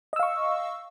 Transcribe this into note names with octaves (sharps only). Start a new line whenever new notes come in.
D#5 F5 C#6 E6